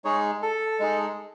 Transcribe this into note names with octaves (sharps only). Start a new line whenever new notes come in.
G#3 D#4 G#4 C#5
A4
G#3 D#4 G#4